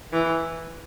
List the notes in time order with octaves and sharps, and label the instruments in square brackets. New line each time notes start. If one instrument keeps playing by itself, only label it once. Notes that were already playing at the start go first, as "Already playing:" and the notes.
[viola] E3